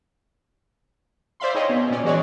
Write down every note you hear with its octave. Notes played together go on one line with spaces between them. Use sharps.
C5 D5 E5 F5 B5 C6
D#4 G#4 C#5 D#5 G5
B2
A#2 C#4 D5
E3 G#3 F#4 G#4 C#5 D5